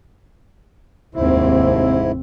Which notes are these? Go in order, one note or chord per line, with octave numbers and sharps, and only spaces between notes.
F1 D#2 G#2 C4 E4